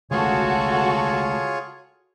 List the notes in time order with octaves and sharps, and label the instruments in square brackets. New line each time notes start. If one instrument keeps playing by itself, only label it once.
[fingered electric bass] C#3 G#3 A3 [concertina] F4 G#4 C#5 [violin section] F#4 A4